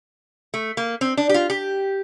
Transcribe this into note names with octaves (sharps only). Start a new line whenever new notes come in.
A3
A#3
C4
D4
G4
F4
G4